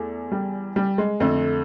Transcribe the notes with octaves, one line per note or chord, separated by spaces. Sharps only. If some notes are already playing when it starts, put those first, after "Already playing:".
Already playing: E2 A3
G3
G3
G#3
F2 D3 A3